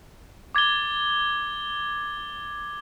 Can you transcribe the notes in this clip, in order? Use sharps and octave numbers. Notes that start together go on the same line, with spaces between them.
D6 G#6 A6 G7